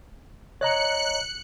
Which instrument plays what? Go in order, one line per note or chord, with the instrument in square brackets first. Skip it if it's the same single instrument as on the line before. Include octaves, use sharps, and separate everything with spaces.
[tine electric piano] C#5 D#5 A#5 [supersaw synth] F#6 C#7